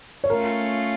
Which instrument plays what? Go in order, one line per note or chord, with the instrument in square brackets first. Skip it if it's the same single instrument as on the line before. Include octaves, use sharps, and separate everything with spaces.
[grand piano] C#5
[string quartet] A3 C#4 F4 [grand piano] A#4